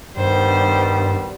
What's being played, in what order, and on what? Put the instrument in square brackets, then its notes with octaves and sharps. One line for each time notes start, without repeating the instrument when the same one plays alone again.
[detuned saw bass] G2 [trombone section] D#3 G3 B3 [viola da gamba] C5